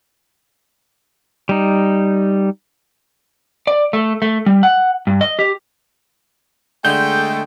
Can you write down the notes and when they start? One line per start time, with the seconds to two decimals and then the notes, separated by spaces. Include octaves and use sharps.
1.49 G3 D#4
3.67 D5
3.93 A3
4.22 A3
4.46 G3
4.63 F#5
5.07 G2
5.21 D#5
5.39 G4
6.85 D3 G#3 A3 G5 G6